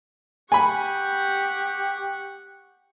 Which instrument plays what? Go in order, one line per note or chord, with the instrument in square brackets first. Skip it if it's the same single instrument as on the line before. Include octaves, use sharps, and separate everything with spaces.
[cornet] G4 [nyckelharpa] F#5 C#6 [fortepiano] G#5 B5